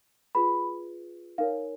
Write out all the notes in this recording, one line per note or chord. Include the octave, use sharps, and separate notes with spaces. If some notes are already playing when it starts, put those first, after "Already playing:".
F4 G#4 B4 B5
D#4 A#4 C#5 F5